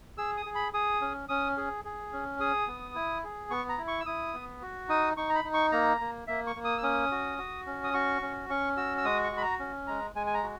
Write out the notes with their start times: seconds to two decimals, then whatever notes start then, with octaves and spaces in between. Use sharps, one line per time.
0.18 G#4 E6
0.37 D#6
0.46 G#4
0.55 B5
0.74 G#4 D#6
1.01 C#4
1.29 C#4 D#6
1.57 G#4
1.85 G#4
2.12 C#4
2.40 G#4 D#6
2.68 B3
2.95 E4
3.24 G#4
3.50 B3 C#6
3.69 A#5
3.78 E4
3.88 C#6
4.00 E6
4.06 E4 D#6
4.34 B3
4.62 F#4
4.89 D#4 D#6
5.17 D#4 C#6
5.30 A#5
5.35 B5
5.44 D#4
5.54 C#6
5.72 A#3 A#5
6.01 A#3
6.27 A#3 E5
6.47 C#6
6.56 A#3
6.64 D#6
6.78 E6
6.83 C#4 D#6
7.11 F#4
7.38 F#4
7.66 C#4
7.84 D#6
7.94 F#4 C#6
8.22 C#4
8.49 C#4 C#6
8.77 F#4 E6
8.97 E6
9.04 G#3 D#6
9.24 C#6
9.32 F#4
9.37 B5
9.42 A#5
9.60 C#4
9.87 G#3 A#5
10.15 G#3 G#5
10.27 G#5
10.34 A#5
10.43 F#4